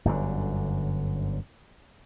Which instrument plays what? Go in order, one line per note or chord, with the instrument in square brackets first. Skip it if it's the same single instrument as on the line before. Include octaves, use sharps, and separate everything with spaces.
[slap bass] G1 F#2 B2 D3